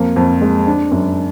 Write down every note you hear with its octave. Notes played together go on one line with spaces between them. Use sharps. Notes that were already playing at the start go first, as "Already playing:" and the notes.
Already playing: F2 A#3
F2
G#3
D4
F#2